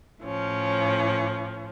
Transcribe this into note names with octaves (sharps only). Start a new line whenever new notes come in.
A2 F3 C#4